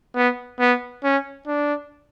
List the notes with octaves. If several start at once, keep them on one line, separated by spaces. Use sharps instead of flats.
B3
B3
C#4
D4